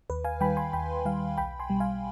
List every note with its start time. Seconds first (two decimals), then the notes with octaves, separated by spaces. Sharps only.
0.10 D#2 B4
0.25 F5 G#5
0.41 D#3 G3 G5 B5
0.57 G#5 C6
0.73 D#2 G5 B5
1.05 D#3 G3 F5 G#5
1.38 B1 G5 B5
1.59 G#5 C6
1.70 B2 G3
1.80 F5 G#5